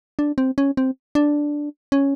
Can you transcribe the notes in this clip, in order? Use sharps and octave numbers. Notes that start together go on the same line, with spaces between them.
D4
C4
C#4
C4
D4
C#4